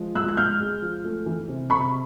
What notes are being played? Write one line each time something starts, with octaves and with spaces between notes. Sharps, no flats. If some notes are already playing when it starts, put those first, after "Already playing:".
Already playing: F3 G#3
G#2 E6 F#6
F#6
G#2 F6 G6
G#3
F3
A3
E3
C3
C3 B5 C#6